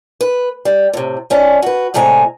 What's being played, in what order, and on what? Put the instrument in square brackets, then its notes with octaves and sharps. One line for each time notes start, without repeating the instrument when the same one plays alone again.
[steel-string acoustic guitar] B4
G3
A2 C3
G#2 C#4 D4
F#4 B4
D2 A2 C3 G#3 G#5 A#5